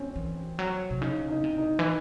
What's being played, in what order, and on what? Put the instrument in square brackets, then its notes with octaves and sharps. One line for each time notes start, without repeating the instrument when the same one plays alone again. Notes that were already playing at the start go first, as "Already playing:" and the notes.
Already playing: [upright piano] C4 C#4
[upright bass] E3
F#3
C3
[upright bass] C#3 [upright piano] D#4
[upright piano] D#4
[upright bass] C3
[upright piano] D#4
[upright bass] E3